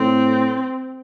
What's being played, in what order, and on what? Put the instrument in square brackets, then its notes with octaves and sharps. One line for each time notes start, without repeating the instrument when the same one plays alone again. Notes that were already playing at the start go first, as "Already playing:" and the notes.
Already playing: [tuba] A2 [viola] C4